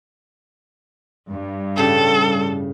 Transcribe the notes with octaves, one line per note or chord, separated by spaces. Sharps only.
G2
A2 C#3 G4 A4